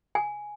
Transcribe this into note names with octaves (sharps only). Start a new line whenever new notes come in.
G#5